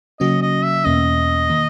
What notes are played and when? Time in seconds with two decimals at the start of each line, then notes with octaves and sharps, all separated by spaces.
0.20 C#3 F#3 A#3 C#4 F#4 D#5
0.42 D#5
0.63 E5
0.84 E2 B2 A#3 C#4 D#5
1.50 D#3 A#3